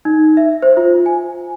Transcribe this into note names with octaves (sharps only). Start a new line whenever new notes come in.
D#4
E5
C5
F4
G#5